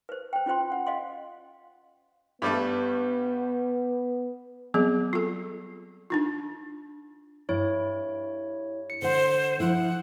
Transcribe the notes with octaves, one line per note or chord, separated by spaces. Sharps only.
B4 C5
C5 G5
C#4 F4 C5 G5 C6
F#5
D#5 F5 C6
G2 G3 A3 B3
F#3 G3 B3 C4 G#4
F4 A4
D4 D#4 F4
G2 E4 C#5
C#7
D3 C5 F#5
F3 E4 F#5